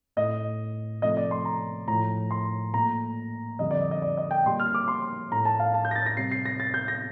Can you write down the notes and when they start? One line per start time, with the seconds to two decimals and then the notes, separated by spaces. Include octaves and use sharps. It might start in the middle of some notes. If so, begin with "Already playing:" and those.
0.16 A2 A3 D#5
1.02 C3 F3 A3 D#5
1.17 D5
1.31 C6
1.45 A#5
1.88 A2 F3 A3 A#5
2.31 C6
2.74 A#2 A3 A#5
3.59 F2 D3 G3 D#5
3.71 D5
3.81 D#5
3.91 D#5
4.02 D5
4.17 D#5
4.31 G5
4.46 A#2 G3 C6
4.60 F6
4.75 D6
4.88 C6
5.32 A2 A3 A#5
5.45 A5
5.60 F5
5.74 A5
5.85 G6
5.91 A#6
5.96 A6
6.06 A#6
6.17 C3 G3 C7
6.32 C7
6.45 A#6
6.60 A6
6.74 G6
6.88 A#6